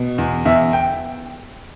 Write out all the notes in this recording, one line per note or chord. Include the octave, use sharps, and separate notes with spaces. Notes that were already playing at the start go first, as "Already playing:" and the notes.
Already playing: B2
E2
E2 E5
G5